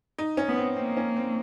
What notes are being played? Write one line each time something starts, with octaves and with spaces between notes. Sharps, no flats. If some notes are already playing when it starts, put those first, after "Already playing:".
D#4
C#4
B3
C4
A#3 C4
C#4
C4